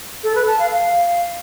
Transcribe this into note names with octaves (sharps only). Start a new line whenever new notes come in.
A4
B4
A5
F5
F5